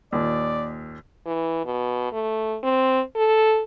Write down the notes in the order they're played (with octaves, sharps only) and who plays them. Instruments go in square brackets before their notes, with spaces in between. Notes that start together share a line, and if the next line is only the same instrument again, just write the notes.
[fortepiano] D#2 A#2 [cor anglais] D5
[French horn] E3
B2
A3
C4
A4